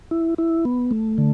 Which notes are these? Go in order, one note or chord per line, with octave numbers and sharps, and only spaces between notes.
E4
E4
B3
A3
D3